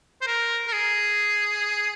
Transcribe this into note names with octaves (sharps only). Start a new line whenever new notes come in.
C5
A#4
A#4
G#4